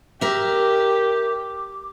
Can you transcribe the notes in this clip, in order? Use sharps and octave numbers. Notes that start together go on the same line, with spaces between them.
G4 A#4 E5 D6